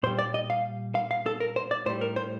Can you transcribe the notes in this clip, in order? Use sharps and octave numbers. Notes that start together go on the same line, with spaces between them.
A#2 G3 C5
D5
D#5
F5
F5
F5
A4
A#4
C5
D5
A2 G3 C5
A#4
C5